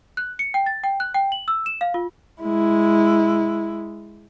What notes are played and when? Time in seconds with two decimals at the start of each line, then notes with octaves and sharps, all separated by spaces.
0.17 F#6
0.39 C#7
0.54 G5
0.66 A6
0.84 G5
1.00 F#6
1.14 G5
1.32 F#7
1.48 E6
1.66 E7
1.81 F5
1.94 F4
2.42 G#3 E4